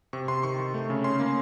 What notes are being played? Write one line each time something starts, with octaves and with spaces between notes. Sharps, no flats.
C3 C#6
C3 C6
D#3 C#6
D#3
A3
C#3
C#4 C6
A#3